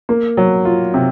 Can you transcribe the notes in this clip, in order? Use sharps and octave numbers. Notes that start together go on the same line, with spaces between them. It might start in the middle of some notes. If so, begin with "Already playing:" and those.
A#3
F#3
F4
C3